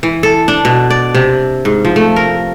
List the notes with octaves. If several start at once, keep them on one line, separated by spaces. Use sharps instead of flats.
E3
A4
D4
B2
D5
C3
G#2
F3
A3
A#4